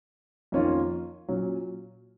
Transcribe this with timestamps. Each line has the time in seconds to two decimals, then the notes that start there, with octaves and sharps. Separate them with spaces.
0.52 F2 D#3 A#3 C#4 F4
1.28 A#2 F#3 C#4